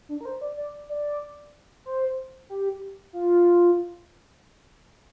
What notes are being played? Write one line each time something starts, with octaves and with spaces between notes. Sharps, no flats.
D4
A#4
C5
D5
D5
D5
C5
G4
F4